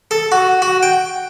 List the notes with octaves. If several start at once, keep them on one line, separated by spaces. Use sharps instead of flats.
A4
F#4
F#4
G5